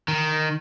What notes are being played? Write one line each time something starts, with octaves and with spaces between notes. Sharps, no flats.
D#3